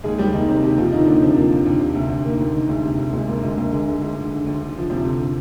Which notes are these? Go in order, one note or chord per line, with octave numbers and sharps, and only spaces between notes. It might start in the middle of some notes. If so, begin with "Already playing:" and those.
D#2 G#3 G#4
D#2 G3 G4
D#2 D#3 D#4
D#2 C3 C4
D#2 G4
D#2 F3 F4
D3 D#3 D#4
D#2 D3 D4
C3 F3 C4
F3 A#3
D#2
D#2
C3
D2
D2
D#3 A#3
D2
D#3
D2 G#3
C3
D2
D2 G#3
D2 A#3
D2 G#3
D2 A#3
D3 G#3
D3 G#3
D2 G#3
D3
D3
D2
D3
F3
D2 C3 C4
D3